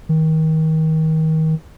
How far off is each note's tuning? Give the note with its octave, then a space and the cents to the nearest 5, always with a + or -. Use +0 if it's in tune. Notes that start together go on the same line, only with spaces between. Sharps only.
D#3 +30